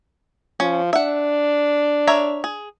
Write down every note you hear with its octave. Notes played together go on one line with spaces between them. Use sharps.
F3 C#4
D4 E5 F#5
A#4 C#5 E5
G#4